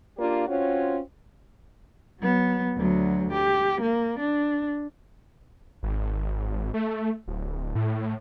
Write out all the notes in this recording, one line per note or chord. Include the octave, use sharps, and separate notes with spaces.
A#3 D4 F4 G4 D5
C4 C#4 F4 F#4 C#5
F#3 B3
D2 F#3
G4
A#3
D4
G#1
A3
D1
A2